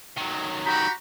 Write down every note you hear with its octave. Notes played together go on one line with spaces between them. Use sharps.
D#3 F#3
F#4 G4 A#5 B5